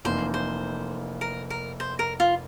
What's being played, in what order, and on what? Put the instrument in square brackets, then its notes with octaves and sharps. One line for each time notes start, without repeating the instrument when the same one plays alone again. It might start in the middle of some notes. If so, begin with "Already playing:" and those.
[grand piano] F1 F2 E3 A#3 [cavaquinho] C5
[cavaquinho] C5
A#4
A#4
C5
A#4
F4